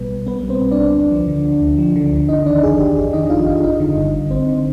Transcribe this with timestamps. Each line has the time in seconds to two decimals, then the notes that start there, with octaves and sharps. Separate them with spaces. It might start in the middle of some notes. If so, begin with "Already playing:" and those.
Already playing: B1 B2 G3 B4
0.11 B1
0.27 B1 B3 B4
0.44 G3
0.49 C4 C5
0.61 B2
0.71 D4 D5
0.78 B1
0.95 D2
1.11 F3
1.28 D3
1.45 D2
1.62 D2
1.78 F3
1.96 D3
2.12 D2
2.28 G1 D#4 D#5
2.46 D#3 D4 D5
2.62 F2 G#4
2.79 G1 G4
2.97 G1 G#4
3.13 D#3 D#4 D#5
3.30 F2 F4 F5
3.47 G1 F4 F5
3.64 G1 D#4 D#5
3.80 D3
3.97 G2
4.14 G1
4.30 G1 C4 C5
4.48 D3